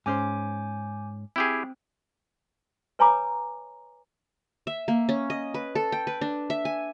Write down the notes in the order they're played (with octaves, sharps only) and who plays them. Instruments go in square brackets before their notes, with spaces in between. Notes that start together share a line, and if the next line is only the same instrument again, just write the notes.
[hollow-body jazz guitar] G#2 C#4 C5 [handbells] G#5 D6 G6
[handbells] C4 [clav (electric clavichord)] E4 G4 G#4
[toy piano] B4 C#5 G#5 A#5 B5 D6
[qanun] E5
A#3
C#4
D#5
B4
A4
G5
B4
D4
E5
G#5